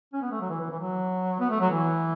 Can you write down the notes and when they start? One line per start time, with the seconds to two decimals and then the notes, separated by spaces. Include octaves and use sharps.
0.13 C#4
0.22 B3
0.31 A3
0.41 F#3
0.50 E3
0.60 E3
0.70 E3
0.80 F#3
1.40 B3
1.50 A3
1.61 F#3
1.70 E3